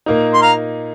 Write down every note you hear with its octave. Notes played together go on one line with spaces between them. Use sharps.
A#2 A#3 D#4
C6
F5 A#5